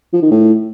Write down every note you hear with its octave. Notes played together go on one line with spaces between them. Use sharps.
F3
D#3
A2